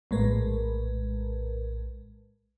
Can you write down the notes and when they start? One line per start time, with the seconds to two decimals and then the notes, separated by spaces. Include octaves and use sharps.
0.11 A#1 A2 G#3 A#4 B4